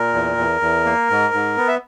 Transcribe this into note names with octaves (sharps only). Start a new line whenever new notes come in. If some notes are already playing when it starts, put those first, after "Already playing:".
Already playing: A#2 A#4
E2
E2
E2
A#3
G#2
G#2
B3
E5